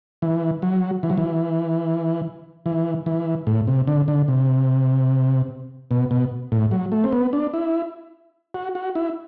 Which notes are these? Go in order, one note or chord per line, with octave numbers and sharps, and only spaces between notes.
E3
F#3
E3
F#3
E3
E3
E3
A2
C3
D3
D3
C3
B2
B2
A2
F#3
A3
C4
B3
D4
E4
F#4
F#4
E4